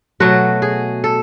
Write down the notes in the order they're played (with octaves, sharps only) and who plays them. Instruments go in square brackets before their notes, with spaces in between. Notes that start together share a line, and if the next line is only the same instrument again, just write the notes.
[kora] B2 F#3 A3 F#4
G#4
A4